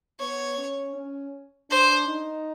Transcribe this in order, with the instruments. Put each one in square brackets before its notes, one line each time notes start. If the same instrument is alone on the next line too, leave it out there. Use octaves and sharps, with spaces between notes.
[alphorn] B3 [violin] C#5
[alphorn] C#4
C#4
[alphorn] D4 [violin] C5
[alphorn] D#4